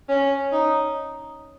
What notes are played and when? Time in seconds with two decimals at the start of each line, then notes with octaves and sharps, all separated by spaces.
0.09 C#4
0.52 D#4